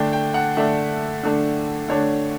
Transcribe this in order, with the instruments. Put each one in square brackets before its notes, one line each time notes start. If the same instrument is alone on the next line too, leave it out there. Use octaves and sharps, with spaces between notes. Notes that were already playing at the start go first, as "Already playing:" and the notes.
Already playing: [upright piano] D3 A3 D4 G5
G5
F#5
D3 A3 D4 E5
D3 A3 D4
D3 A3 D4 C#5